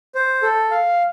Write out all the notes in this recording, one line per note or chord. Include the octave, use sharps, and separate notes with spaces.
C5
A4
F5